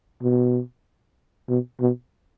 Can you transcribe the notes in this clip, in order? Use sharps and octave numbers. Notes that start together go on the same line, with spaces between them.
B2
B2
B2